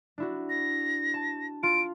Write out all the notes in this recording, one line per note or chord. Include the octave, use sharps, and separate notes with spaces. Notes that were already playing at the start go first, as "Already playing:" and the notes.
D4 E4 F#4
A#6
A5
F4 D7